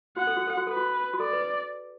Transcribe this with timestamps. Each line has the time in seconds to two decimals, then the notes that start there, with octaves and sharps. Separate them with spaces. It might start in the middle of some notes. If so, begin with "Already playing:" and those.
0.17 F#4 F#5
0.27 A4
0.37 F#4
0.47 A4
0.57 F#4
0.67 A4 B4
0.77 F#4
1.14 F#4
1.20 A4 D5
1.33 B4